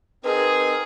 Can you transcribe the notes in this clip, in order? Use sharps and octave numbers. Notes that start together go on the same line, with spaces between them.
C4 D#4 G#4 A#4 B4